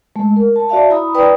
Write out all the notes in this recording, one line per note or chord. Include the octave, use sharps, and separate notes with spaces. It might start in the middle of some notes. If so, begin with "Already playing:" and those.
G#3 A3
A#4
A5
F#4 D5 E5 F5 A5
E4 A#5 B5 D#6
B4 D5 G5 A#5 B5 D#6